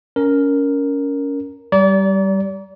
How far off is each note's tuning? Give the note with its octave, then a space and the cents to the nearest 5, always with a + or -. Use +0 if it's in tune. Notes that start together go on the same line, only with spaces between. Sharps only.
C#4 +20 A#4 +0
G3 -10 D5 -35 A#5 +15